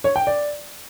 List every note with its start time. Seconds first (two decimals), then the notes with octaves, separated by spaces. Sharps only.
0.04 C#5
0.16 G5
0.27 D5